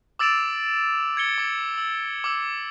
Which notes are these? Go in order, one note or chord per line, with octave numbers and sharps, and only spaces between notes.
D6 E6 A6 D7 E7 F7
G#6 C#7 G7
D6
E6
D6 E6